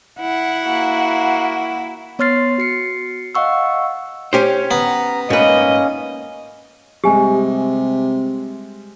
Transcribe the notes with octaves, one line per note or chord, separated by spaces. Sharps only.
E4 F#5
A#3 F#4
B3 C#5 C6 F6 A6 C7
F#4 C7 C#7
D#5 F5 F#5 C#6 E6
C#4 G4 C5
B3 A#5
G#2 A#3 C#4 B4 D#5
C3 G3 G#3 G4 G#5